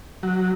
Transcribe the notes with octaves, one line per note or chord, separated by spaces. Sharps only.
F#3